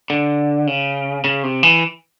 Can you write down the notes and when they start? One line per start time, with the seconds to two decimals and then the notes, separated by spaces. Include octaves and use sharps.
0.10 D3
0.67 C#3
1.24 C#3
1.43 C3
1.63 E3